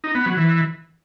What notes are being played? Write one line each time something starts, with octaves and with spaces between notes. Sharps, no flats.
D#4
B3
F#3
E3